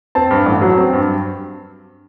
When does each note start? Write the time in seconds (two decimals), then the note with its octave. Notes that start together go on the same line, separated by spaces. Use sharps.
0.15 C4 A5
0.31 G2
0.46 A1
0.62 F#3
0.77 C4
0.93 G2